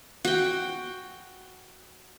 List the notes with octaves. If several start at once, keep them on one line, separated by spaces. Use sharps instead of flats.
F#4 G5